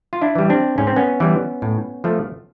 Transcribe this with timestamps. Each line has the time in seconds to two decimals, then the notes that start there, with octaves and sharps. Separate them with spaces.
0.13 F4
0.22 D4 E4
0.35 E3 G3
0.50 C4 D4
0.78 G#2 C#4
0.87 C4
0.96 B3 C#4
1.20 E3 G3
1.62 A2
2.04 F3 A3